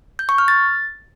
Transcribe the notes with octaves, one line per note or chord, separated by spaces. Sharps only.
G6
C#6
F6
A6